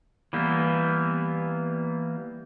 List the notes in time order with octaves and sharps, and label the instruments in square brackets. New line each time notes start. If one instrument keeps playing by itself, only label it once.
[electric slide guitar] E3 G3 A#3 B3